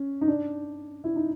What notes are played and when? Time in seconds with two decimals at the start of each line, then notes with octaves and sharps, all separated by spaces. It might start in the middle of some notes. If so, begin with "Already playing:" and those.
Already playing: C#4
0.21 D#4
0.27 D4
1.04 E4
1.16 D#4